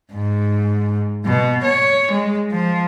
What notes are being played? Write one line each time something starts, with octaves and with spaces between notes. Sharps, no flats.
G#2
B2
C#5
G#3
F3